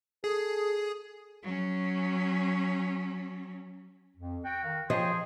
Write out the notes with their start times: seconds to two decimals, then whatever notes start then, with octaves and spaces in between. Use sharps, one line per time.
0.24 G#4 A4
1.43 F#3 C#4
4.17 F2
4.45 F#4 G5
4.64 D#3 F5
4.90 F3 G#4 C#5 D#5 G5 C6